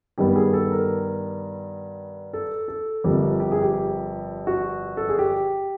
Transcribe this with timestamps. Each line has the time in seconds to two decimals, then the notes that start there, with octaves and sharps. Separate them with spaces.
0.18 G2 D#3 G3 B3 G4
0.36 G#4
0.53 A4
0.72 A#4
2.33 A4
2.68 A4
3.04 G1 F2 D3 G3 A#3
3.40 G4
3.52 G#4
3.62 G4
4.47 F#4
4.97 A4
5.09 G#4
5.19 G4